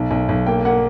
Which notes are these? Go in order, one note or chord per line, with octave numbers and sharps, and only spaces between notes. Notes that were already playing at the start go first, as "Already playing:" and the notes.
Already playing: B1
B1
B1
A#3 G5
A#3 F#5